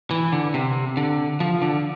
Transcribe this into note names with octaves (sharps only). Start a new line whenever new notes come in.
E3
D3
C3
D3
F3
D3